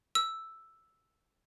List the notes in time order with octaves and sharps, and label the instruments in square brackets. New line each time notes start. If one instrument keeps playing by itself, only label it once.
[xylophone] E6